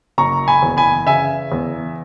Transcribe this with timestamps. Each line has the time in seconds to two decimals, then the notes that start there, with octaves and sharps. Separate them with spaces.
0.18 F#1 A#5 C#6
0.48 G#5 B5
0.62 E2
0.77 G#5 B5
1.07 C#3 E5 G#5
1.52 E2